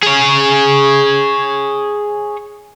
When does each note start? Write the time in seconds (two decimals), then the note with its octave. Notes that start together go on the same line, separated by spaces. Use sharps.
0.03 G#4 C#5